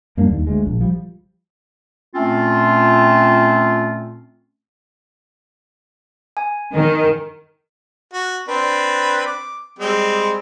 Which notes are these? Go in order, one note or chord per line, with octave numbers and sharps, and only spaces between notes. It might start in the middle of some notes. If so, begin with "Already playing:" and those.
F#2 G3 A#3 D4
D#2
D2 G#3
A#1
F3 G3
A#2 A3 C4 C#4 F4
G#5
D#3
F#4
C4 D4 B4
D6
G3 G#3 C4